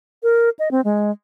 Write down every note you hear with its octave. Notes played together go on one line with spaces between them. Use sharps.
A#4
D#5
C4
G#3